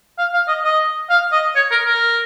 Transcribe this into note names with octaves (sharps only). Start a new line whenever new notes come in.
F5
F5
D#5
D#5
F5
D#5
C#5
A#4
A#4